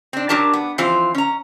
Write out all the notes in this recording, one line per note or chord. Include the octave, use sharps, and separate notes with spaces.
C4 D4
F#3 D4 G4 A#4 A5
B3
E3 F3 C4 F4 C5
C#4 A#5